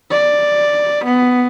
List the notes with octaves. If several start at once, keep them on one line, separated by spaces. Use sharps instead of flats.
D5
B3